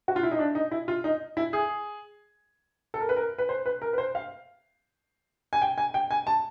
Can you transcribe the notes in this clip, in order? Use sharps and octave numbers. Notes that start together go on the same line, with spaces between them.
F#4
F4
E4
D#4
D4
D#4
E4
F4
D#4
E4
G#4
A4
A#4
B4
A#4
B4
C5
B4
A#4
B4
C5
F5
G#5
G5
G#5
G5
G#5
A5